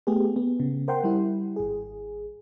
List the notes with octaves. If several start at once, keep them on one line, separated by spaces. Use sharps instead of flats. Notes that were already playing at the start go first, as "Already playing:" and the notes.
A3 B3 G4 G#4
B3
C#3
A#4 C5 F#5 G5 C6
G3 E4
G#1 G#4